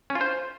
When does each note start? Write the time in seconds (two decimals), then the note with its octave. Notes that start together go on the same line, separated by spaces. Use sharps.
0.10 C#4
0.15 F4
0.21 C5